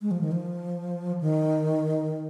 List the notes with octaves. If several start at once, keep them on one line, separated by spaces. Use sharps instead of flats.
G#3
F3
D#3
F3
D#3